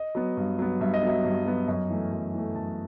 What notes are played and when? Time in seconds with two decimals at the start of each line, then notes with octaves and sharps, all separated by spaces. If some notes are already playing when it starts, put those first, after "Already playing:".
Already playing: D#5
0.15 F#3 B3
0.37 G2
0.59 F#3 B3
0.81 G2 E5
0.94 D#5
1.03 F#3 B3 E5
1.25 G2
1.46 F#3 B3
1.68 F#2 D#5
1.90 E3 A3
2.12 F#2
2.34 E3 A3
2.55 F#2 A5